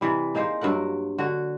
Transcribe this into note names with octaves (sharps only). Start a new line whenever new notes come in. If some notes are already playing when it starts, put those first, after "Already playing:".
C3 E3 G3
A#3 D#4 G#4 C5
G2 F#3 A#4 F#5
D3 F#4